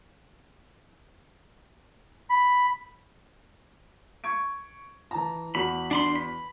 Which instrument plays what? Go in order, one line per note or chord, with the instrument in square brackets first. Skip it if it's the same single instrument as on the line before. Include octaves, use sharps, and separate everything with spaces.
[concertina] B5
[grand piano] C#6 G#6 D7
E3 A5 A#5
[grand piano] E2 F#4 [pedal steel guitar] B5
[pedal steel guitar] D4 B5 C6
B5